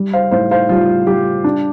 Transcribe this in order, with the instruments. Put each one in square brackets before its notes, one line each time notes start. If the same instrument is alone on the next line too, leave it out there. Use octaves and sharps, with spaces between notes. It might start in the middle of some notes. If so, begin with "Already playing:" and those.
Already playing: [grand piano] G3
C5 F5
A2 C5 F5
C5 F5
G3 F4
G3 G4
D4